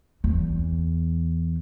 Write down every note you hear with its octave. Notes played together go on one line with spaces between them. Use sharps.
E2